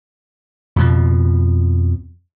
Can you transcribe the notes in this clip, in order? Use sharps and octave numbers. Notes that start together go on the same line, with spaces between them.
F2 B2 F3